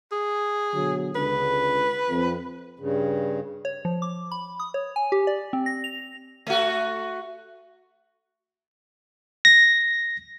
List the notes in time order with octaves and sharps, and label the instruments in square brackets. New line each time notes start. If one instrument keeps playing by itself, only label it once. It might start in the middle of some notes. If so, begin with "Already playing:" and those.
[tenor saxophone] G#4
[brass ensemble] B2 D3 F#3
[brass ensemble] C#2 D3 [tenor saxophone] B4
[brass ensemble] F2
[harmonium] G2 C#3
[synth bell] C#5
F3
D6
B5
D#6
C#5
G#5
G4
D5
C4
A#6
F7
[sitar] A3 F#4
[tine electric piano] A#6